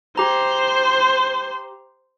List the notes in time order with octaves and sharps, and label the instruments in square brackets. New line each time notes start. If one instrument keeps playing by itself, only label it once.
[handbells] G4 A#5 [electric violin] C5